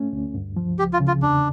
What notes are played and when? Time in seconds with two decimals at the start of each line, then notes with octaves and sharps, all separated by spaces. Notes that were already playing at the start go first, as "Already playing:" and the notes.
Already playing: A3 C#4
0.13 D2
0.34 G2
0.56 F3
0.79 C#2 G4
0.93 F4
1.00 C#3
1.08 F4
1.22 E2 D4